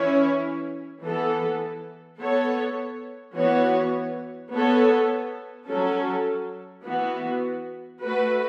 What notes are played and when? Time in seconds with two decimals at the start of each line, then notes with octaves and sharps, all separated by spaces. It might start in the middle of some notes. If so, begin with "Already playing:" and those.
Already playing: E3 C#4 E4 C#5
1.03 E3 B3 A4
2.20 B3 A4 C#5
3.36 E3 B3 F#4 C#5
4.53 B3 A4 C#5
5.69 F#3 C#4 A4
6.86 E3 B3 F#4
8.02 A3 F#4 B4